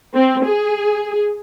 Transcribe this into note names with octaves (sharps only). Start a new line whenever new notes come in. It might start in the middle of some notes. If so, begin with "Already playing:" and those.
C4
G#4